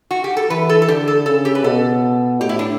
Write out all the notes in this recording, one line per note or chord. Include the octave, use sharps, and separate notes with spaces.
F#4
G4
A4
E3 B4
A4
A4
D3 G4
A4
C#3 A4
G4
B4
B2 A4
A2 G4
E4
D4